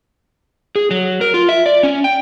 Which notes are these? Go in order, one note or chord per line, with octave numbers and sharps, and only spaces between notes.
G#4
F#3
A#4
F4
E5
D5
C#4
G5